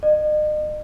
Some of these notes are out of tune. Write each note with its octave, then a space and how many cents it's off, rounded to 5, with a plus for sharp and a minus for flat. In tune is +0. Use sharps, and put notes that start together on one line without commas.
D#5 -40